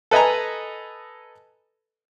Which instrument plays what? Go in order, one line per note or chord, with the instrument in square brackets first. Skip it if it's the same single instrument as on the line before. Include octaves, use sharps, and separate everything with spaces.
[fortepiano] A4 B4 D#5 G#5 A#5